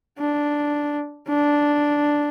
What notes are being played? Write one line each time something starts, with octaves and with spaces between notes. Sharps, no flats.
D4
D4